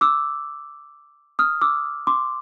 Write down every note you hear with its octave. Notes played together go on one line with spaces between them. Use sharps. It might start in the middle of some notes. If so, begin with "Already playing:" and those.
D6 E6
D#6 F6
D6 E6
C6 D6